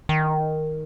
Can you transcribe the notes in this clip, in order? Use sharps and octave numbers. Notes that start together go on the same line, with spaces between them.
D#3